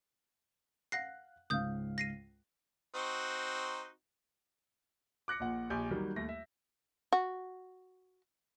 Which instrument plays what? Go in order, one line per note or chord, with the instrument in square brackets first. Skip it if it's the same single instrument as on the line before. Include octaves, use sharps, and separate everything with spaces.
[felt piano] F5 F#6 [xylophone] F#5 A#6 C7
[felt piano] C#2 G#2 F5 [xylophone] D#6 G6
[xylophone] A#6 C7 D#7
[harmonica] C4 D#4 F#4
[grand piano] D6 F#6 A#6 C#7
A#1 A#2 F#5
A#1 G4 G#5 G6
D#3 F#3 G3 A#3
D#2 A3 A#6
E5
[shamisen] F#4